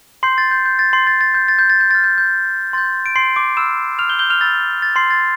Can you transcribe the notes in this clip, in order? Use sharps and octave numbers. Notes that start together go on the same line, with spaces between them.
C6 G6 C7
A6
G6
G6
A6
C6 C7
C6 G6 A6
A6
G6
A6
G6
A6
G6
C6 F6 A6
G6
G6
C6 G6 A6
D7
C6 C7
D6 D7
B5 E6 F6 E7
F6 F7
G6 G7
G6 G7
F6 F7
B5 E6 G6 A6
A6
C6 C7
A6